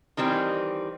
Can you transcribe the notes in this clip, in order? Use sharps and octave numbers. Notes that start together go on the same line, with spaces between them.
D#3 E3 G3 C4